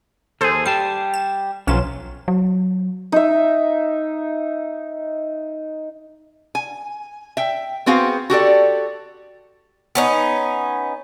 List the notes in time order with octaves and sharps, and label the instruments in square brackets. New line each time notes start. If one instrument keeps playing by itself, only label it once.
[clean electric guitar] D#2 G#4 [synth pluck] A4 C5
[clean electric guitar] G3 G4 A5 [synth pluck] C7
[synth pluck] E7
[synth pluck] B1 C#4 E7 [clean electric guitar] F3 F#3 F4
[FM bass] F#3
[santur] D#4 E5
[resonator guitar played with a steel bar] G#5
E5 G5
B3 C4 F#4 G#4 F5
F#4 G4 A4 D5
[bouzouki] B3 C#4 D#4